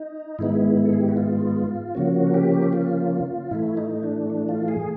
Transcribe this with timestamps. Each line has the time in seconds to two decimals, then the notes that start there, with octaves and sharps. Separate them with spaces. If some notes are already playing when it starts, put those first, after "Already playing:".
Already playing: D#4
0.39 G#2 D#3 G#3 B3 E4
0.85 A4
0.93 G#4
1.01 G4
1.09 F#4
1.17 F4
1.95 C#3 F3 A#3 C#4 F#4
2.34 G4
2.73 F4
3.51 A2 E3 A3 E4
3.77 D#4
4.03 D4
4.30 D4
4.49 F4
4.68 G#4